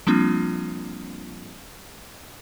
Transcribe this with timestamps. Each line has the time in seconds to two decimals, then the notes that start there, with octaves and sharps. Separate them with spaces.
0.07 F3 G3 A#3 C4 D4 F4